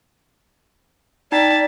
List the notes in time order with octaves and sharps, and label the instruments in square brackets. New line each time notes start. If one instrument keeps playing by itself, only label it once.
[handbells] D#4 G5 B6 [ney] D5 [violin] A5